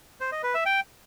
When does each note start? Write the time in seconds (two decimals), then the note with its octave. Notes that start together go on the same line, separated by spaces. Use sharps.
0.21 C5
0.32 D#5
0.43 B4
0.54 E5
0.66 G5